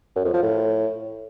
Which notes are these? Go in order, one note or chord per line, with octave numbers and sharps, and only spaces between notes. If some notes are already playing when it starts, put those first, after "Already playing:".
F#2
F2
F3
A2